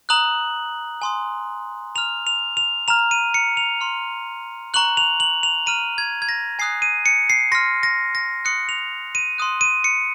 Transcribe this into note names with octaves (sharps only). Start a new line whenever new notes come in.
A#5 D#6 F#6 F#7
G#5 C6 D#6
A#5 F6 F7
F7
F7
A#5 F6 F7
D#7
C#7
F7
C6 F6
A#5 C#6 F#6 F#7
F7
F#7
F7
A#5 F6 D#7
G#6
G#6
A#6
G#5 D#6 F#6 C7
D#7
C#7
C7
C6 F6 A#6
A#6
A#6
C6 D#6 F#6 C#7
F7
D#7
C6 D#6 F#6
D#7
C#7